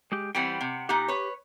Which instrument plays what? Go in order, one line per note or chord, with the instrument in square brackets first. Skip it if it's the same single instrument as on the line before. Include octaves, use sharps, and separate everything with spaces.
[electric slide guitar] G#3 G4
[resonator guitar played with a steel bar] E3 G3 C4 [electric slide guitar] F#5 G5
[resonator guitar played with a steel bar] C3
[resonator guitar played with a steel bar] A#2 D#4 F#5 [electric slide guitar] G4
[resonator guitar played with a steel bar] B4 C#5